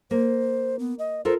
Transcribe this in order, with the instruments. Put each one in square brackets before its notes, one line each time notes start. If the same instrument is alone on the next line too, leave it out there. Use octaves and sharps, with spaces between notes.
[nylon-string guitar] A#3 [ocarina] C5
[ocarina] B3
D#5
[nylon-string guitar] F4 A4 A#4 [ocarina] C5